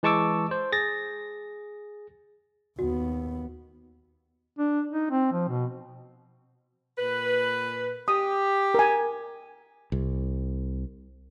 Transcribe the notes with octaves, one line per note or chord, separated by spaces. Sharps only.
E3 G#3 A5 C#6 D6 E6
C5
G#4 A6 A#6
D#2 B3 F#4
D4
D#4
C4
F3
B2
A#2 B4
G4 D#6
A#4 G#5
C2